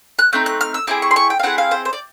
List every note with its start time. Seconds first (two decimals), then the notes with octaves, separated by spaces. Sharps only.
0.19 F#6
0.33 A3 C4 D#4 G6
0.46 F#6
0.61 F6
0.74 E6
0.87 C4 E4 G#4 D6
1.02 C#6
1.11 C6
1.16 C#6
1.30 G5
1.39 F5
1.43 C4 E4 G#4 F#5
1.58 F5
1.71 C5
1.85 C5
1.93 D5